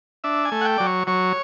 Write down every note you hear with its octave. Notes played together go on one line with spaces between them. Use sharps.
D4 E5
G#5
A3
F#5
G5
F#3 D5
C#5
F#3 C#5